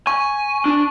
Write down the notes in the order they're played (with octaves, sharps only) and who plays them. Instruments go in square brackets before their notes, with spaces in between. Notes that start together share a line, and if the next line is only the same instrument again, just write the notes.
[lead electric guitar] G#5 [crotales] C#6
[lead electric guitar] D4